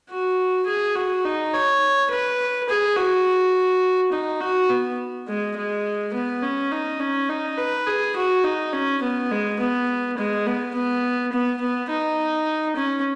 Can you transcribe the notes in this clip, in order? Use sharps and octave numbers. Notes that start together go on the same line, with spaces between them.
F#4
G#4
F#4
D#4
C#5
B4
G#4
F#4
D#4
F#4
B3
G#3
G#3
B3
C#4
D#4
C#4
D#4
B4
G#4
F#4
D#4
C#4
B3
G#3
B3
G#3
B3
B3
B3
B3
D#4
C#4